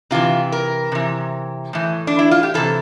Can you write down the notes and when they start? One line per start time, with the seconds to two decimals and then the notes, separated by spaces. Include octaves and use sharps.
0.11 C3 E3 F4
0.52 A#4
0.92 C3 E3
1.73 A2 E3
2.07 D4
2.19 E4
2.31 F4
2.43 G4
2.54 C3 E3 A4